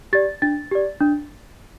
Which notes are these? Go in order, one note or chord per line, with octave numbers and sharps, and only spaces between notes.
G4 D5 A6
D4 A6
G4 D5
D4